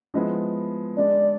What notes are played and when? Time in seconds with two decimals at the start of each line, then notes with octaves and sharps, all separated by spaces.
0.14 F3 G#3 B3 E4
0.97 D3 G#3 D4 D5